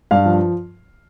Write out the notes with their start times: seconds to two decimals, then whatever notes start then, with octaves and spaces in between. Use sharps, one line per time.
0.11 G2 F5
0.26 F3